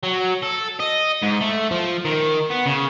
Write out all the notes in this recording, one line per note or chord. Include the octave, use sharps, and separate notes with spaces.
F#3
A4
D#5
G#2
A3
F3
D#3
B3
C#3